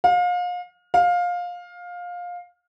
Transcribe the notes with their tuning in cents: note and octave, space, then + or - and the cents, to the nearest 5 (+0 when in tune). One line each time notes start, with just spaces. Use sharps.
F5 +35
F5 +20